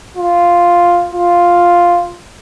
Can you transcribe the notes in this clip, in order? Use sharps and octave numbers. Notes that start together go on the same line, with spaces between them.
F4
F4